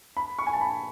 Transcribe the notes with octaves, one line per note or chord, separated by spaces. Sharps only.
B5
C#6
G#5
A5
B5